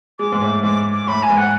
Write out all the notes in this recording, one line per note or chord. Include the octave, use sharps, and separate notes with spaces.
G#3 D6
G#2
A2
G#2 D6
D6
A2 B5
G#5
G#2
F#5